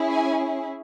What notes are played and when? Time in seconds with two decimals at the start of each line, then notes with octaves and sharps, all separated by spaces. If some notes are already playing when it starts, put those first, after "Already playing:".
Already playing: C#4 E4 G#4
0.11 G#5